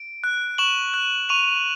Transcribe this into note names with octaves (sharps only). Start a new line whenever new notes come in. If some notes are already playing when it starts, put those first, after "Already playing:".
Already playing: D7
F#6
C#6 E7 F#7
F#6
C#6 D#7 F7